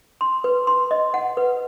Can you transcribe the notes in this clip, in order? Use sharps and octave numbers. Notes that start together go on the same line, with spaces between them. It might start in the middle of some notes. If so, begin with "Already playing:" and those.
C6
B4
C6
D#5
F#5
B4